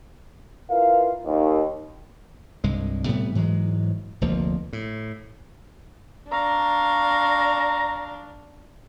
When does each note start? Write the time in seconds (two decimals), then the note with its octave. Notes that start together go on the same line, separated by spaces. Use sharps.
0.70 E4 F4 A#4 B4 F5
1.25 D#2
2.64 C2 G2 G#3
3.07 A2 C3 G3 B3
3.35 G#2 E3 F#3 G#3
4.21 F1 D2 F3 A#3
4.73 A2
6.31 D4 F5 A#5 C#6